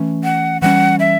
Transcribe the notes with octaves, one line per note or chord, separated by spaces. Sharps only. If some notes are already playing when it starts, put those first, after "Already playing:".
Already playing: E3 A3 C#4
F#5
E3 G3 C#4 F#5
E5